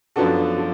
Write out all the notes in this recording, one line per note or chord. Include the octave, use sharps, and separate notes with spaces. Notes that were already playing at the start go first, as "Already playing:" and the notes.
F#2 F3 B3 D4 F#4 A4
F3